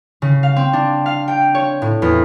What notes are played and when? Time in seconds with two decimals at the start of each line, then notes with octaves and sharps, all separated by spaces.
0.22 C#3
0.43 F5
0.56 C4
0.73 D4
1.06 F5
1.28 G5
1.55 C#5
1.82 A2
2.02 E2